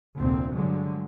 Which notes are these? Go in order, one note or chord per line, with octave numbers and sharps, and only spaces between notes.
F1 D2 A#2 C4
G2 D3 F#3 G#3